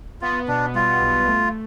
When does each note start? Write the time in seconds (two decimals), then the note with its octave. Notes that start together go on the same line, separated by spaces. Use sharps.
0.21 B3 F4
0.48 B2 D4
0.75 G3 F4
1.01 B1
1.27 A3